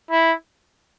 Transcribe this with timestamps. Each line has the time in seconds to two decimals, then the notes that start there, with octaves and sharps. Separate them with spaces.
0.11 E4